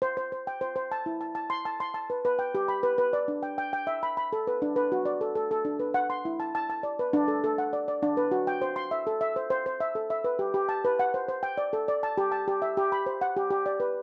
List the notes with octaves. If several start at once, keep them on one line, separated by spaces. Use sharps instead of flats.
C5
C5
C5
G5
C5
C5
A5
E4
A5
A5
C6
A5
C6
A5
B4
B4
G5
G4
B5
B4
B4
D5
D4
G5
G5
G5
E5
B5
B5
A4
B4
D4
B4
F#4
D5
A4
A4
A4
D4
B4
F#5
C6
E4
A5
A5
A5
D5
B4
D4
A4
A4
F#5
D5
D5
D4
B4
F#4
G5
C5
C6
E5
A4
E5
C5
C5
C5
E5
A4
E5
B4
G4
G4
A5
B4
F#5
C5
C5
G5
D5
A4
D5
A5
G4
A5
G4
E5
G4
B5
C5
F#5
G4
G4
D5
B4